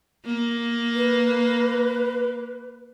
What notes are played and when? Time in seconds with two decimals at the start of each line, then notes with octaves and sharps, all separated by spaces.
0.25 A#3
0.95 B4